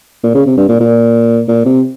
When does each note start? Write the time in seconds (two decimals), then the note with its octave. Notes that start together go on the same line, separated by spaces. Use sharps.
0.23 A#2
0.35 C#3
0.46 C3
0.57 G2
0.69 A#2
0.80 A#2
1.48 A#2
1.65 C3